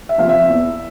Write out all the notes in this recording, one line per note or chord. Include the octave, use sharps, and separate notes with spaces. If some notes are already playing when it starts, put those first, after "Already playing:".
E5
C3 F3 F5
E5
E2